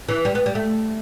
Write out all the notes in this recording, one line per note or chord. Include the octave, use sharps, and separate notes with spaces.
E3
G3
B3
G3
A3